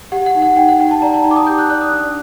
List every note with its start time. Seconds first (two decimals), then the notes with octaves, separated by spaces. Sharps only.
0.12 G4 F#5
0.26 F#5
0.35 D#4
0.42 F#5
0.56 D#4 G5
0.69 F#5
0.79 D#4 G5
0.91 A5
1.02 D5 A#5
1.14 A5
1.24 D#4 A#5
1.31 D6
1.36 D#6
1.47 G4 G6
1.59 F#6
1.70 D5 F#6
1.81 D#6
1.92 D4